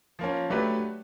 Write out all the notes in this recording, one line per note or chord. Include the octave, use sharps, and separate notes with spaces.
F3 A#3 C#4
F#3 A3 D4 G4 B4